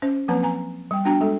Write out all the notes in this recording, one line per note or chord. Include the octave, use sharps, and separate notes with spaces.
C#4 C5
F3 F#3 A#3 C4 B4 A#5
G#5 A#5
G3 G5
B3 D4 F#4 G5 A#5
G#3 A4